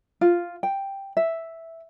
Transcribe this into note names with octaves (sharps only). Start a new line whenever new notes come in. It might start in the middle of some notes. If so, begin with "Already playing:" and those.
F4
G5
E5